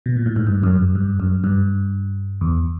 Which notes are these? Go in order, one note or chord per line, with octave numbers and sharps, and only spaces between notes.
B2
A#2
A2
G#2
G2
F#2
F#2
G2
F#2
G2
E2